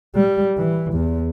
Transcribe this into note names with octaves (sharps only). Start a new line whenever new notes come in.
G3
E3
E2